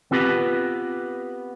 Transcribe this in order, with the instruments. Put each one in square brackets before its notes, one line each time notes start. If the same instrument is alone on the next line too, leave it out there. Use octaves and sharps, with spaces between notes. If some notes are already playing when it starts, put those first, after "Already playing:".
[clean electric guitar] B3 C4 F4 G4 B4